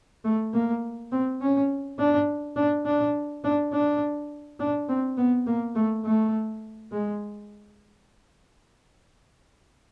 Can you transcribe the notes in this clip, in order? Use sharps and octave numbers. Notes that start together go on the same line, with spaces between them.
A3
A#3
C4
C#4
D4
D4
D4
D4
D4
D4
C4
B3
A#3
A3
A3
G#3